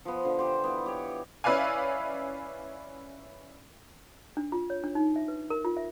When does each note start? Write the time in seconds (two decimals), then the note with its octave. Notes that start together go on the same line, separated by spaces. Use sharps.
0.05 F3 B3
0.24 D3 F3
0.39 G4 C5
0.64 E3 B3
0.86 G4 C#5
1.44 C#4 E4 B4 D5 F5 G#5
4.37 D4
4.52 F4
4.70 C#5
4.84 D4
4.95 D#4
5.16 E5
5.28 B4
5.50 A#4
5.65 F4
5.77 E5